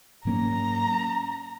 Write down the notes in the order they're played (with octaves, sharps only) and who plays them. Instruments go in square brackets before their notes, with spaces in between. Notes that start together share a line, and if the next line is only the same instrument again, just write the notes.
[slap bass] G#2 F#3 A#3 C#4 [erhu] A#5